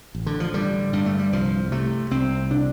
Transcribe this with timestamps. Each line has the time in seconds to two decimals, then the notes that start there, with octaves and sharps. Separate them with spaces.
0.15 A1
0.26 D3
0.40 F3
0.54 D3 G3
0.93 G2 G3
1.06 A3
1.19 G3
1.33 C2 F3
1.72 C3 A3
2.11 C2 C4
2.50 C3 D4